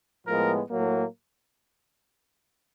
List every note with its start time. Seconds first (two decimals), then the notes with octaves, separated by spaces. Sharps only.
0.26 A2 F3 G#3 B3 A#4
0.71 A2 F#3 A#3